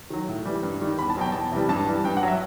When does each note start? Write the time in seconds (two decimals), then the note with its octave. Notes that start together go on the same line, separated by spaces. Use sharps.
0.10 D#3 F#3
0.28 A2
0.45 E3 G3
0.63 G2
0.81 D#3 G3
0.99 E2 B5
1.10 A5
1.16 B2 F#3 G5
1.32 E2 A5
1.52 C3 E3 G3
1.69 G2 A5
1.86 E3 G3
2.04 G2 G5
2.17 F#5
2.23 F#3
2.28 E5